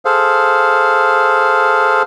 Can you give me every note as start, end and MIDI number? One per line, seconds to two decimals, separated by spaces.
0.05 2.02 68
0.05 2.02 69
0.05 2.02 72
0.05 2.02 77